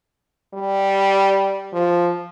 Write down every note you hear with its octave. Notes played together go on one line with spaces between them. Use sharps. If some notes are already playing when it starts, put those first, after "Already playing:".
G3
F3